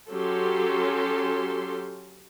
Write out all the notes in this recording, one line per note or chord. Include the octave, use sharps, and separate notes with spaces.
F#3 C#4 G4 A4 C6